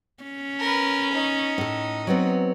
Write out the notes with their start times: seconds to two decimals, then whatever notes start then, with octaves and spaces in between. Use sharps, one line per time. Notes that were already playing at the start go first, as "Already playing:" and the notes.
0.23 C#4
0.60 A#4 B4
1.13 D#4
1.58 A2 A4
2.07 F#3 B3 C4